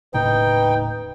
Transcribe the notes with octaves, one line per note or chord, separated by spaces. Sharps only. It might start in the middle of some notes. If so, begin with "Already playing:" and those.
D#1 A2 C#3 D#4 B4 G5